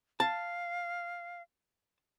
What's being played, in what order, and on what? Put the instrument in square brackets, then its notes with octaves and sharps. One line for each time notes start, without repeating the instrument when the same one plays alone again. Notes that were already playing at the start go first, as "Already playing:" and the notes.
[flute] F5 [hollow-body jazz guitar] A5